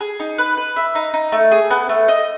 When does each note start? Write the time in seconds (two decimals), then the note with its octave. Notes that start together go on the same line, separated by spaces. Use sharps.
0.01 G#4
0.20 D#4
0.38 B4
0.57 B4
0.76 E5
0.95 D#4
1.14 D#4
1.32 A3
1.51 G#4
1.71 B3
1.89 A3
2.08 D#5